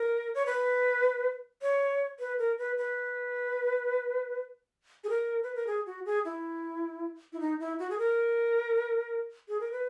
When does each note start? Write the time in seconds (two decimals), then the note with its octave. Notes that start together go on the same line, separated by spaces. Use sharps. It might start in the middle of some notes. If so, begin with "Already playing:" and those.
Already playing: A#4
0.35 C#5
0.46 B4
1.62 C#5
2.20 B4
2.39 A#4
2.58 B4
2.78 B4
5.04 G#4
5.10 A#4
5.43 B4
5.55 A#4
5.67 G#4
5.86 F#4
6.06 G#4
6.25 E4
7.33 E4
7.40 D#4
7.60 E4
7.79 F#4
7.90 G#4
7.99 A#4
9.49 G#4
9.60 A#4
9.72 B4